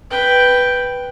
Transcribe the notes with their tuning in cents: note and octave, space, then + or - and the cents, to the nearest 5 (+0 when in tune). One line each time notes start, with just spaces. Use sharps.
B4 +0 G5 +0